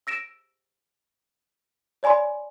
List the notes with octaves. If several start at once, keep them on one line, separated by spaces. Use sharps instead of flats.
E6 A#6 D7 E7
C#5 D5 G#5 B5 C6